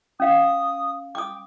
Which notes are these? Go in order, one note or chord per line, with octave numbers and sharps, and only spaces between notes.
C#4 F5 D#6
G5 D6 D#6